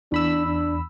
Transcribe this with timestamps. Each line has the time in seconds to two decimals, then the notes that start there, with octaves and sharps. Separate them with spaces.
0.12 E2 D4 B5 E6
0.46 D4